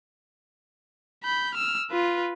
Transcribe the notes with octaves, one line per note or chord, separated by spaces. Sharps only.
B5 G6
E6 F6
F4 B4